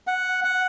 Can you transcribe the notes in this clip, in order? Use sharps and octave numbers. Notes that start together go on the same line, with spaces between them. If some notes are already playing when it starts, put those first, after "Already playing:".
F#5
F#5